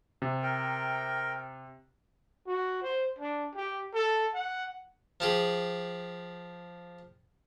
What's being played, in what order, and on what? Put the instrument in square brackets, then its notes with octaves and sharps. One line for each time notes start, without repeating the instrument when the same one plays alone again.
[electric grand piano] C3
[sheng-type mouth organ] A#4 G5
[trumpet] F#4
C5
D4
G4
A4
F#5
[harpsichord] F3 G4 G#4